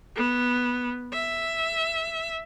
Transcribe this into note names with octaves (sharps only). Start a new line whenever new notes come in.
B3
E5